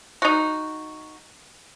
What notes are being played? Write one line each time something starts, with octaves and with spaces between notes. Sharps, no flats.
D#4 F#4